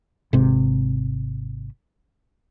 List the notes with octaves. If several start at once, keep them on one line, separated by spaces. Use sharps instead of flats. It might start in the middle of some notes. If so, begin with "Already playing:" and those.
G#1 C3